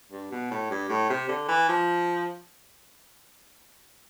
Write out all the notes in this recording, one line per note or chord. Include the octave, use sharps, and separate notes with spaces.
G2
B2
A2
G2
A2
C3
D3
E3
F3